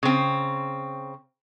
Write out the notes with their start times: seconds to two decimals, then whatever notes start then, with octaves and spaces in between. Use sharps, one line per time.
0.03 C#3 C4